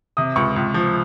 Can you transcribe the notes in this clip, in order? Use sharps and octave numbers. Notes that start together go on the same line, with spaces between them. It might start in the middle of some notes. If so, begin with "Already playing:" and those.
C3 D#6
C#2 C#6
C#2
F3